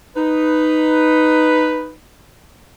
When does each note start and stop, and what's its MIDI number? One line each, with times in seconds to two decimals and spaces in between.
0.16 1.94 63
0.16 1.94 71